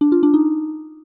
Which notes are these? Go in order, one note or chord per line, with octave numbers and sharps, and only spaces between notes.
D4
F4
D4
D#4